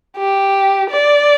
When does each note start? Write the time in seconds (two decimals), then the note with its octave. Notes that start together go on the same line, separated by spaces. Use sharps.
0.18 G4
0.91 D5